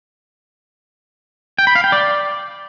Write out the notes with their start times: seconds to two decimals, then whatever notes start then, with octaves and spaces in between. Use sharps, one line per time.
1.59 G5
1.67 B5
1.75 F5
1.84 G5
1.92 D5